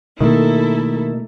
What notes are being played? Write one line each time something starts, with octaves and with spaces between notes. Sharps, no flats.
B2 D#3 A3 A#3 E4 A4